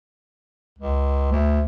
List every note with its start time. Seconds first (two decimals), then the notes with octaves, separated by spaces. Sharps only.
0.79 C#2
1.32 D2